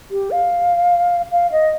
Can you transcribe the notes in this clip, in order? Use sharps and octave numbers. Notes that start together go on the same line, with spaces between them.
G4
F5
F5
D#5